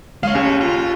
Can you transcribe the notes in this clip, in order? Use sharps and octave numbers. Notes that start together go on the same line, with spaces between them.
G#3 C#5 F5
F#1 D#2 C#4
F4